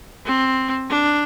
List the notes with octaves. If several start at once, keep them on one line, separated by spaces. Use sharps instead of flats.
C4
D4